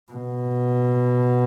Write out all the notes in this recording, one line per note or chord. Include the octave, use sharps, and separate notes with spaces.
B2